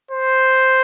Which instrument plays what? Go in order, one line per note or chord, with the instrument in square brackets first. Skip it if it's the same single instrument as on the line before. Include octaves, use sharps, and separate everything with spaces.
[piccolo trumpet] C5